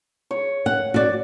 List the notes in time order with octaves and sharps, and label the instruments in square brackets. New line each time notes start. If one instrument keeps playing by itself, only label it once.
[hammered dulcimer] C#5
[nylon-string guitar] F#5
F#4 D5